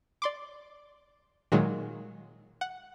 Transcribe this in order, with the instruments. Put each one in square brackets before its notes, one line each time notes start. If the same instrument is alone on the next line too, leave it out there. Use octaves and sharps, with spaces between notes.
[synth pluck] D5 C6 D6
A#2 D#3 F#3 G#3
F#5